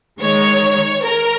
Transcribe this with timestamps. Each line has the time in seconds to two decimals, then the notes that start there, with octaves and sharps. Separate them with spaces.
0.21 D#3 G#3 C#5
1.05 A#4